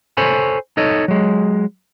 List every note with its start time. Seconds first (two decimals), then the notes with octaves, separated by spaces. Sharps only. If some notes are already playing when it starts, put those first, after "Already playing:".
0.17 A4 C5 C#5 G#5 B5
0.77 D#4 A4 C#5 D#5
1.08 F#3 G#3